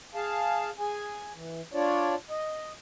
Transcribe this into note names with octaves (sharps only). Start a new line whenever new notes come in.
G#4 F5 A5
G#4 G#5
E3
D4 F4 C#5 D5
D#5